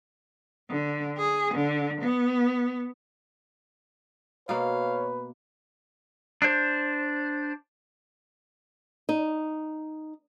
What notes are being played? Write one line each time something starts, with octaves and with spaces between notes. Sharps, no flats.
D3
G#4
D3
B3
B2 A#3 B4 C#5 F5
D4 C5
D#4